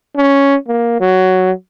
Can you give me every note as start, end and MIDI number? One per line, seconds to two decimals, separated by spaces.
0.16 0.56 61
0.68 0.96 58
1.00 1.51 54